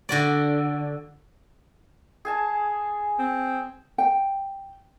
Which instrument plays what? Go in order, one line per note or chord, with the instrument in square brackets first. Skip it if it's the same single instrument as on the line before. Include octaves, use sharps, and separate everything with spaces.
[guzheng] D3 F#4 D5
[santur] G#4 G#5 A5
[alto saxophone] C4
[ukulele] G5